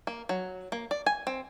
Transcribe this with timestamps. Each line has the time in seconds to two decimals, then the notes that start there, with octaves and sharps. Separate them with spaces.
0.07 A#3
0.29 F#3
0.72 A#3
0.91 D5
1.06 G#5
1.27 C4